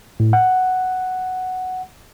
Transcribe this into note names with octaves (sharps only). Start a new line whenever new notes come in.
A2
F#5